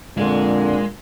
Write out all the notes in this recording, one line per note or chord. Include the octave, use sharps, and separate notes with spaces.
F2 A#2 D3 G#3 F5